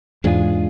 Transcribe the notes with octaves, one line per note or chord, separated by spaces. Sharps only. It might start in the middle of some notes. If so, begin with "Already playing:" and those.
E2 G#2 G#3 D4 F4 G#4